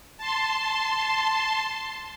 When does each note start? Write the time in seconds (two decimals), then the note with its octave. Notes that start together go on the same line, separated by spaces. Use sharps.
0.17 A5 C6